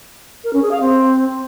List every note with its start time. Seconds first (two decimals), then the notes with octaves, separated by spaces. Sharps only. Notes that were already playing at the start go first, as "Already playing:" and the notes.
0.44 A#4
0.53 C#4
0.62 G#4
0.71 F5
0.81 C4